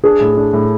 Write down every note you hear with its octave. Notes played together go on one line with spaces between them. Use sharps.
D4 G#4
A2
D4
A2